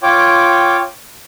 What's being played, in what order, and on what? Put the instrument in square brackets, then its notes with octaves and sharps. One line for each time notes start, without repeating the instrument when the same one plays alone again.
[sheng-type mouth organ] F4 C#5 G5 D6